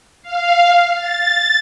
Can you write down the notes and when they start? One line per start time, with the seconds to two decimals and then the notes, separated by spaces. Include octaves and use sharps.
0.23 F5
0.95 A6